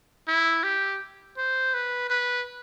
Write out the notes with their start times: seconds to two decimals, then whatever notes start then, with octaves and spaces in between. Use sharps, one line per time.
0.28 E4
0.64 G4
1.38 C5
1.74 B4
2.10 B4